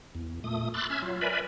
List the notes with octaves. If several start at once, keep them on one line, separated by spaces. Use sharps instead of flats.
E2
A#2 A3 D#6
B5 C6 D6 E6 F#6 A6
C#4 E5 E6 F6 G#6
F#3 F4
A#4 B4 D5 E5 G#5 B5